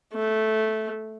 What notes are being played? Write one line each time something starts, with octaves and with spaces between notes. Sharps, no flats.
A3